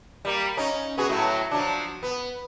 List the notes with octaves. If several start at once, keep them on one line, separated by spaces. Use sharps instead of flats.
G3 A#3
C#4 D#4
B3 F#4 G#4
A2 F#3 A3
F3 F#3 D4
B3